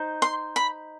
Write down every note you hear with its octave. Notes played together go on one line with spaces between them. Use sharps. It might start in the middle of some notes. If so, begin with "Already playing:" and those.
Already playing: D#4 C5
C6
B5